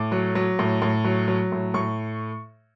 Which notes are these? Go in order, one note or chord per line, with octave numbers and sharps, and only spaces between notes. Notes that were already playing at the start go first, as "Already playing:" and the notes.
Already playing: A2 D6
F#3
F#3
A2
A2
F#3
F#3
A2
A2 C#6